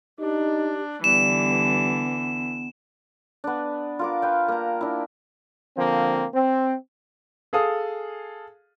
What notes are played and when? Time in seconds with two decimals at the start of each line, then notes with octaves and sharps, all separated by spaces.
0.20 D4 D#4 G4
1.04 D3 E3 G3 B3 E7
3.44 B3 D4
3.99 F4 A#4 D6
4.22 B4 F5 G5
4.48 A#3 A#5
4.81 D4 E4
5.77 D3 F3 A#3 C4
6.33 C4
7.53 G#4 A4 F5 D#6